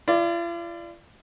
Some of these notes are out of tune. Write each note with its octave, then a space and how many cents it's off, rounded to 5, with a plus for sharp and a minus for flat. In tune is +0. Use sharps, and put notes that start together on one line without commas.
F4 -45 D5 +5